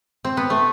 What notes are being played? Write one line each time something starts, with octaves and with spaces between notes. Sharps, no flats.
C4
B3
A3